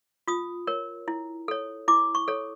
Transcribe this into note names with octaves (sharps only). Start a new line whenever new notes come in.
F4 D#6
A#4 C#5
E4
A4 C#5
E4 D6
C#6
A4 C#5